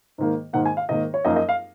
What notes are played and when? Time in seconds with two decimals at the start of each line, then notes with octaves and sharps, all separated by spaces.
0.18 G#2 D#3 A#3
0.53 G#2 D#3 A#3 F#5
0.66 G#5
0.77 F5
0.89 G#2 D#3 A#3 D#5
1.14 C#5
1.25 F#2 F3 A#3 D#4 D#5
1.36 D#5
1.49 F5